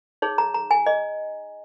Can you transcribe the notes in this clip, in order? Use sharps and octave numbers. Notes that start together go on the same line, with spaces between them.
D#4 G#4 C#5
A#5
A#5
G#5
D#5